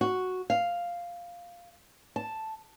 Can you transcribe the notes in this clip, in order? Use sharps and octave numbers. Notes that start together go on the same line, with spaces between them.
F#4
F5
A5